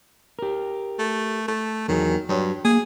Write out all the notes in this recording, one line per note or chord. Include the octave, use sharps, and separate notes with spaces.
G4 A#4
A3
A3
E2 D#3 F#3 G#4
G2 F#3 C#5
A#3 G#4